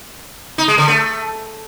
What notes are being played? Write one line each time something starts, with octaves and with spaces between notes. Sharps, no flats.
D#4
G#3
D3
A3